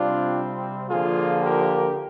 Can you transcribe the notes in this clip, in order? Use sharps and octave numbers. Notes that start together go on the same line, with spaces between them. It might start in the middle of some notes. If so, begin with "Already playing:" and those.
Already playing: C3 G3 C4 D4 F4
D3 F3 A#3 F4 G#4
G4 A#4